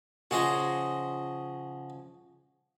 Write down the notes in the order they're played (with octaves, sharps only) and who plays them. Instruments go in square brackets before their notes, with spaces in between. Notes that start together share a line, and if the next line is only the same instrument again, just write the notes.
[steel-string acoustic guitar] C#3 F3 [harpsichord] F#4 G#4 D#5